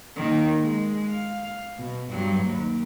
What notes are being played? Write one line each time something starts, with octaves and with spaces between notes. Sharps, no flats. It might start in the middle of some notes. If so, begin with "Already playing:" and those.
D#3 A#3
G#3
F5
B2
G2 F#3
D#2